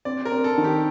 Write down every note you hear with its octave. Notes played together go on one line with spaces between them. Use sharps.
C4 D5
A#4
C4
A4
D#3
G4